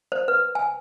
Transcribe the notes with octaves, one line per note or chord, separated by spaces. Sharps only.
C5
B4
G#5